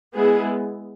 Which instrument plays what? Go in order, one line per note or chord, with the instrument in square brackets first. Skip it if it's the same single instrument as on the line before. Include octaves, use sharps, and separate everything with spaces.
[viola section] G#3 B3 E4 G#4